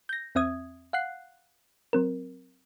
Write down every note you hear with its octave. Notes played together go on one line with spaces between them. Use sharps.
G6 A#6
E2 C4 E5 D#6 G#6
F5 F#5 F#6 C7
F#3 C4 A#4